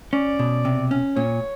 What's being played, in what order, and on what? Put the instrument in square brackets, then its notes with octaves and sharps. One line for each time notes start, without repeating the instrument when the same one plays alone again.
[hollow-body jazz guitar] C#4 [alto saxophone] D5
[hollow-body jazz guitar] B2
C3
C#4
[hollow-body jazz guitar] A#2 [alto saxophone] C#5